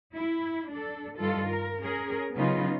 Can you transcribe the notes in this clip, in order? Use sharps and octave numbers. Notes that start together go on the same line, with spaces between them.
E4
D4 A4
G2 D#3 F4 A4
A#4
C#4 G#4 A#4
C#3 F#3 B3 D#4 F4